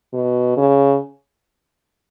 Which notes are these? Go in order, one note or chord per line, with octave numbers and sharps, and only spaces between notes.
B2
C#3